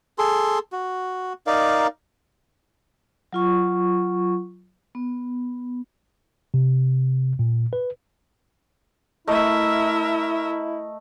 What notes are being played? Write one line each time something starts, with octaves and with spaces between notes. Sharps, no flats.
G#4 A4 C6
F#4
D#4 A#4 D5 F5
F#3 F4 C#6
B3
C3
A#2
B4
A3 E4 A#4 D#5 E5